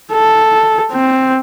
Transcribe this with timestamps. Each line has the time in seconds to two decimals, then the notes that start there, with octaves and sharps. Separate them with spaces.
0.12 A4
0.92 C4